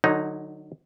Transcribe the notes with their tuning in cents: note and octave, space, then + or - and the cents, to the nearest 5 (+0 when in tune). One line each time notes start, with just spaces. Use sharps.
D3 +30 F#3 +0 D#4 +0